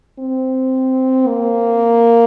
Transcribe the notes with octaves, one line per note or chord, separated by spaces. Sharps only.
C4
A#3